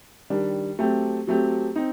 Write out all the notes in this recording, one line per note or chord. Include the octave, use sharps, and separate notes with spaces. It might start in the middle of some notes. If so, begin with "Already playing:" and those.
D#3 G3 D4
F#3 A3 C4 G4
F#3 A3 C4 G4
C4 D#4